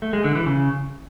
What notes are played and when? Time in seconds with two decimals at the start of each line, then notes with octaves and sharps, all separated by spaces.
0.02 A3
0.13 G#3
0.24 D3
0.35 E3
0.46 C#3